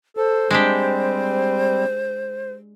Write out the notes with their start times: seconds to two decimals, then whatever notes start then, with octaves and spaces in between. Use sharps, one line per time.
0.17 A4 C5
0.51 G3 G#3 C4 D4 G4